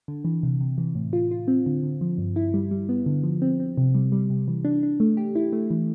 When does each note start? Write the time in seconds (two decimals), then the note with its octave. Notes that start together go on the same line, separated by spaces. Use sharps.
0.08 D3
0.25 E3
0.43 C3
0.61 C3
0.78 E3
0.95 A2
1.13 F4
1.31 F4
1.48 C4
1.66 D3
1.83 D3
2.01 F3
2.18 G2
2.36 E4
2.54 G3
2.71 G3
2.89 B3
3.06 D3
3.24 F3
3.42 C4
3.60 C4
3.77 C3
3.95 G3
4.12 G3
4.30 C3
4.48 E3
4.65 D4
4.83 D4
5.00 A3
5.17 G4
5.35 E4
5.53 A3
5.70 E3